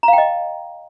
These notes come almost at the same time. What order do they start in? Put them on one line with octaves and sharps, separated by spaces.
A#5 F5 G5 D#5